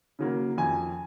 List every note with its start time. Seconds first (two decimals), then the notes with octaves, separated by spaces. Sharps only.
0.19 C#3 F#3 A#3
0.58 F2 G#5